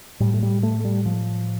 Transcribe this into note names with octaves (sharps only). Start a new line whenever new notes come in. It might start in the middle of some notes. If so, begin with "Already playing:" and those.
A2 G3
A3
G3
A3
G3
F3